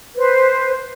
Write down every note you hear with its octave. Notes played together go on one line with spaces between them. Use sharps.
B4 C5